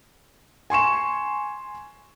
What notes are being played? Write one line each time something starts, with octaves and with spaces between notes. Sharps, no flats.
G#5 C6 C#6 E7